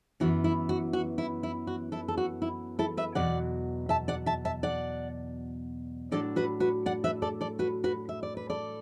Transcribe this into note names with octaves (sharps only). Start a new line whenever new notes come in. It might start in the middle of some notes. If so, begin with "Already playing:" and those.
F#2 E3 B3 F#4
E4
F#4
F#4
E4
E4
F#4
E4 A4
A4
F#4
E4
E4 A4
B4 E5
E2 B2 F#3 D5 F#5
E5 A5
D5 F#5
E5 A5
E5 A5
D5 F#5
A2 F#3 D4 A4 D5
F#4 B4
F#4 B4
D5 F#5
B4 E5
A4 D5
A4 D5
F#4 B4
F#4 B4
E5
D5
B4
A4 D5